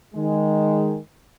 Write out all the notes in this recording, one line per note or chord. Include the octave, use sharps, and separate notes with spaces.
D#3 G#3